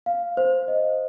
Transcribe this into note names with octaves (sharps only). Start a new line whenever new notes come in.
F5
C5
D#5